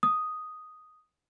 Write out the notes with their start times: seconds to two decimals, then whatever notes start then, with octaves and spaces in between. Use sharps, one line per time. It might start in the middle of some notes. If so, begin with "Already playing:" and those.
0.03 D#6